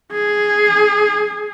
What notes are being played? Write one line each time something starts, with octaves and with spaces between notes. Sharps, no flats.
G#4